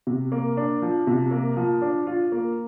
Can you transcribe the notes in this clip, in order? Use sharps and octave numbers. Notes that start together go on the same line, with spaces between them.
C3
A#3
D4
F3
C3
A#3
F3
D4
F4
A#3